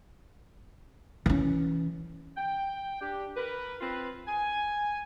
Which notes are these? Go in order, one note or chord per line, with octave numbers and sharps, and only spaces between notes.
E3 C#4
G5
D4 G4
A#4 B4
C4 F4 B4
G#5